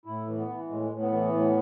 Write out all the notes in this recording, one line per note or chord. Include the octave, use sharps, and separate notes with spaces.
A2 E4
E3
B3
E3
A2 G#3
A2
B3
E3
A2